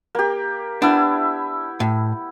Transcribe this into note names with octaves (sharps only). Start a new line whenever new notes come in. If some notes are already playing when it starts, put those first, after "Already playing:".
A#3 G4
B3 D4 E4
A2